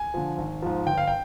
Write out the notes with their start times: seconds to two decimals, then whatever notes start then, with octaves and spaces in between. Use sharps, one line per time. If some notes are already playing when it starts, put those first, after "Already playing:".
Already playing: G#5
0.14 D3 F3
0.38 G#1
0.62 G#2 F3
0.87 G1 G5
0.98 F5
1.07 G5